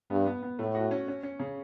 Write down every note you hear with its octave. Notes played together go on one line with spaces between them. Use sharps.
G2 B3
B3
B3
A2 A3
F#4
C#4
C#4
C#4
C#3